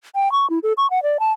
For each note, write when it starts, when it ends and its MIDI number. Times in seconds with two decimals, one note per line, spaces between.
0.15 0.31 79
0.32 0.48 85
0.50 0.59 64
0.63 0.73 69
0.78 0.89 85
0.90 1.02 78
1.03 1.18 74
1.20 1.33 81